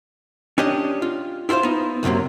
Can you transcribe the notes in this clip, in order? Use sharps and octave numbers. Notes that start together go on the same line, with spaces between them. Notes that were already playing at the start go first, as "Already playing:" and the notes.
C#4 D4 G4 D#5
F4
E4 F4 A4 C5 F5
B3 D#4
C2 F#2 C3 F#3 A#3